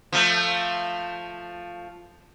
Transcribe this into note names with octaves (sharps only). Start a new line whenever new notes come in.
F3 A3